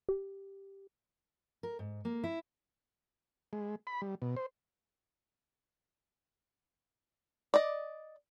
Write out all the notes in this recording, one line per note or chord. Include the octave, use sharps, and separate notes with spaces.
G4
A#4
G#2
A#3
E4
G#3
B5
G3
B2
C5
D5 D#5